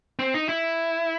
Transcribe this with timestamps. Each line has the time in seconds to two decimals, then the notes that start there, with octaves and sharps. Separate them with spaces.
0.19 C4
0.34 D#4
0.49 E4